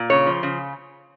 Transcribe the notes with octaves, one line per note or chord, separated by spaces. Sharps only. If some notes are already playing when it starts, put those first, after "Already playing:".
Already playing: A#2
C#3 C#5
F3
C#3